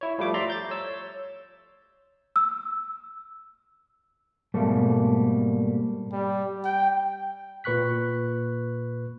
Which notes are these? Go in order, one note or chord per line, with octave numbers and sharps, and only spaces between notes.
E4 C#5
F3 G3 A3 D6
D5 E5 A#5 C6
G6 A6
C#5 E6
E6
G#2 B2 G3 A3 A#3
G3
G5
A#2 B4 C#6 F#6 B6